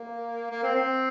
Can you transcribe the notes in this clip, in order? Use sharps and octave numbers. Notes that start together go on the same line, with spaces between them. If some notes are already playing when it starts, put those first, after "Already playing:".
Already playing: A#3
A#3
C4
C4